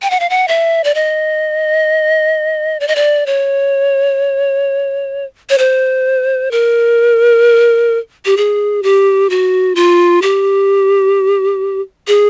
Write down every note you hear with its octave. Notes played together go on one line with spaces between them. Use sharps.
G5
F#5
F5
F#5
E5
D5
D#5
D5
D#5
D5
C#5
C#5
C5
A#4
G4
G#4
G4
F#4
F4
G4
G#4